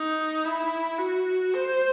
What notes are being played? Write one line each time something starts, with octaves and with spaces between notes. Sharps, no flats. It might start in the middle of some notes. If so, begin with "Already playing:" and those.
Already playing: D#4
E4
F#4
C5